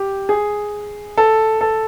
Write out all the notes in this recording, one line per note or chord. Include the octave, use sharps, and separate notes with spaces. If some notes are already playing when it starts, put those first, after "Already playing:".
Already playing: G4
G#4
A4
A4